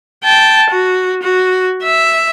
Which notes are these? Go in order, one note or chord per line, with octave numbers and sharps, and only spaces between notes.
G5 A5
F#4
F#4
E5